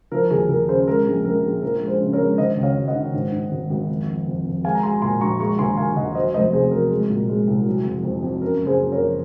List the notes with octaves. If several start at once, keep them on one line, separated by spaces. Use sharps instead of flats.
F3 A#4
D#2 G#4
D#2 A#4
C#3 G#4 C5
G#3 A#4
A#1 G#4
A#1 A#4
A#1 G#4
F3 A#4
G#3
G#4 C5
C#3
A#4 C#5
G#3
D#3 C5 D#5
C#2
C#5 F5
C#2
D#5 F#5
D#3
G#2
G#2
G#1
G#1
F2
F3
F2
F2
G#3 F5 G#5
A#5
G#3 G#5 C6
A#2 G#5 C6
A#1 A#5 C#6
G#3 A#5 C#6
D#2 G#5 C6
D#2 F5 G#5
D#2 D#5 F#5
F#3 C5 D#5
F1 C5 D#5
C3 G#4 C5
F#3 A#4
G#3
A#2
G#3
C2
F#3
F2
F2
F2
F#2 A#4
F#1
G#4 C5
F#2
A#4 C#5
F3